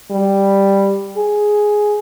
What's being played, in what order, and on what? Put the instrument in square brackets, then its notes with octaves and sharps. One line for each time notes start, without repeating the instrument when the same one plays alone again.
[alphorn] G3
G#4